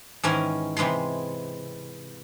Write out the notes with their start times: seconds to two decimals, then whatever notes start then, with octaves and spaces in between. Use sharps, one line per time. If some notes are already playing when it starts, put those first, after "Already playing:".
0.23 G#2 D#3 E3 C#4 A#4 G#5
0.77 C3 E3 G#3 B5 C6